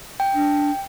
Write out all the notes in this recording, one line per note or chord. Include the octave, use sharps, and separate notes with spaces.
G5
D4